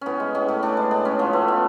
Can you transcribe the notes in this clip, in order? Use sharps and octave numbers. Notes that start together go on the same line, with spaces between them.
A2 B3 C#4
G#3
A2 C#4
A2
A2 D4
G#3
A2 D4
G#3 C#4
F3 B3
A3 B3
F3